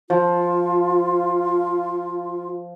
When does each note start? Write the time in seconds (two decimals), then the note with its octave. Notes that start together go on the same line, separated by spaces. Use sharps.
0.10 F3 F4